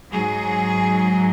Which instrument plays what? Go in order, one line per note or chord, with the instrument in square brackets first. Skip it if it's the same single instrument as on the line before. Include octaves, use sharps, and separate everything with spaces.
[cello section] G#2 F#3 G#4